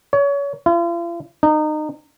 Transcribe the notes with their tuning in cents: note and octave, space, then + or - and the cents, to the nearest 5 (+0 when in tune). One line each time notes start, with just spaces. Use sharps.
C#5 +30
F4 -40
D#4 -25